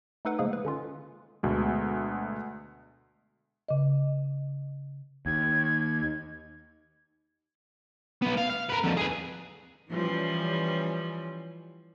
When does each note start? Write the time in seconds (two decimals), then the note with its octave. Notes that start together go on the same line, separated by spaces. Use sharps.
0.25 A3 D#4 A4 B4 F#5
0.39 C#3 F3 G#3 A#3 G#4
0.53 B4
0.65 D3 C#4 F4
1.43 D2 B2 G#3
3.68 C#3 D#5
5.26 D#2 G#6
8.22 B1 B3
8.38 F5
8.50 F5
8.70 A#4 B4
8.84 F2 D3
8.97 G#4 B4
9.91 E3 F3 G3 C#4